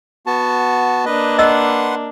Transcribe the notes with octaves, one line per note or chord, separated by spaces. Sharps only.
B3 F#4 A5
A#3 D4 B4 D#5
B4 D#5 F#5 C6 E6